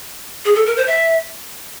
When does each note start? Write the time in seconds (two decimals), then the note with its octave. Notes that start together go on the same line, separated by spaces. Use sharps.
0.45 G#4
0.56 A4
0.66 A#4
0.77 C5
0.87 E5